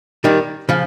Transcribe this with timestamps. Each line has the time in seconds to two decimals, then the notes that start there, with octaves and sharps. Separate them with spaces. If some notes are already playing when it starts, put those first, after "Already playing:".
0.24 D#3 G3
0.69 C#3 F3